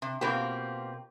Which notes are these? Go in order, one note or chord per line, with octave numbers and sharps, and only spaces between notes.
C3
B2 A#3 C4 F4 G4